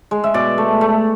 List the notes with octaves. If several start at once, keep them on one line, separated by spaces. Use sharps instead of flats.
G#3
E5
B2 D5
A3
A3